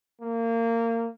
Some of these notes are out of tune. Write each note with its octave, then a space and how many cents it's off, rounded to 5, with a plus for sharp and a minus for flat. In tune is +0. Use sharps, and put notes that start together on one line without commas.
A#3 -25